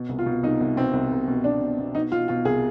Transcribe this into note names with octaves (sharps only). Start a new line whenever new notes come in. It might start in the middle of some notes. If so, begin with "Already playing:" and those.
Already playing: B2
C2
F4
B2
C2 D#4
C2
B2 C4
C2
C2
B2
B2 D4
B2
B2
B2 D#4
B2 F4
B2 F4
C2 G#4